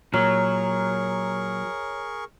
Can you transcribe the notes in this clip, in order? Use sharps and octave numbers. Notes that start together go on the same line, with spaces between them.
A#2 F#3 G#4 A#4 C#5 A#5 C#6 F6